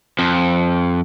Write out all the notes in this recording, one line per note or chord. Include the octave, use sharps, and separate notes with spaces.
F2 F3